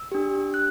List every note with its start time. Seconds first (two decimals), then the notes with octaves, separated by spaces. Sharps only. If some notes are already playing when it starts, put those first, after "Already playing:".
Already playing: E6
0.12 D4 G4
0.54 F#6